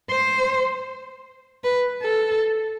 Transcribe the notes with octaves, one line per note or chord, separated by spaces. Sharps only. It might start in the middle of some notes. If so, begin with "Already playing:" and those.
C5
B4
A4